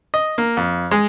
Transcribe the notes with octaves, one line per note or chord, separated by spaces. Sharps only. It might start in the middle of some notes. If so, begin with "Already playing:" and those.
D#5
A#3
F2
G#3